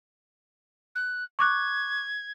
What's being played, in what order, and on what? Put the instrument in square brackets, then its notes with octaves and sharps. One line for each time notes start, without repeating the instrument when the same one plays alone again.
[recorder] F#6
[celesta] C#6 D6 F#6 [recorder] G#6